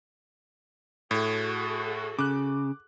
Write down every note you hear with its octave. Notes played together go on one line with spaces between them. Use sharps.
A2 F#4 G#4 A4
C#3 D6 F#6